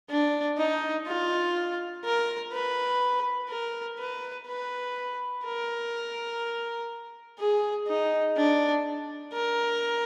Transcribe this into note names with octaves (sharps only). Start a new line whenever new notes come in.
D4
D#4
F4
A#4
B4
A#4
B4
B4
A#4
G#4
D#4
D4
A#4